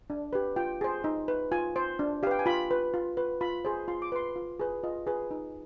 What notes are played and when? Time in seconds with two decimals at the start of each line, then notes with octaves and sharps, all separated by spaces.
0.10 D4
0.33 G4 B4
0.56 F4 G5
0.81 G#4 C5
1.04 D#4
1.28 B4
1.52 F4 G#5
1.76 C5
1.99 D4
2.23 G4 F5
2.27 B4 G5
2.39 G#5
2.46 F4 B5
2.71 B4
2.94 F4
3.17 B4
3.41 F4 B5
3.65 G#4 C5
3.88 F4 C6
4.02 D6
4.12 B4 C6
4.36 F4
4.60 G#4 B4
4.83 F4 D#5
5.07 G#4 B4
5.31 D#4